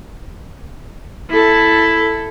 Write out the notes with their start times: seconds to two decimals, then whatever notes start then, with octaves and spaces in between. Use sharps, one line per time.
1.30 E4 A4